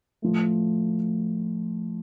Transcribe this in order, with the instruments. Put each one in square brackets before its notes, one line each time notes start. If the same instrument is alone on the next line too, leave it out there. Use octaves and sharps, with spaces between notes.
[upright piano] A2 F3 A3